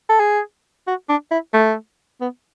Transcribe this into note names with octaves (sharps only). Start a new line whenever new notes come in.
A4
G#4
F#4
D4
E4
A3
B3